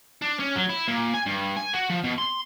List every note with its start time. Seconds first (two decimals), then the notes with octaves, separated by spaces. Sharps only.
0.22 D4
0.39 C#4
0.55 F#3
0.69 E4
0.88 A#2
1.14 G#5
1.26 G2
1.56 G#5
1.73 F#4
1.90 F3
2.04 B2
2.18 C6